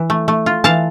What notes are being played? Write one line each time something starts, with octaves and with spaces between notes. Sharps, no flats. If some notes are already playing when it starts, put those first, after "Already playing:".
Already playing: E3
A3
A3
F4
E3 F5 A5